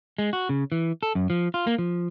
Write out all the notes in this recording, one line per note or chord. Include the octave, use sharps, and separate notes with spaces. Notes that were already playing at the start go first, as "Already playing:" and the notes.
G#3
F#4
C#3
E3
A4
F#2
F3
F4
A#3
F3